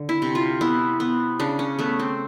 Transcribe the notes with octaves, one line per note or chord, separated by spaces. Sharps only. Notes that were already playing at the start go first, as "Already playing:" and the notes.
Already playing: D3
E4
C3
F4
B3 E4
B3
C#3 D4
C#4
A3 B3
C4